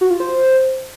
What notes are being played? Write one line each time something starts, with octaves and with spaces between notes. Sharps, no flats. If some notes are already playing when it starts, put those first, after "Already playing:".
F#4
F4
C5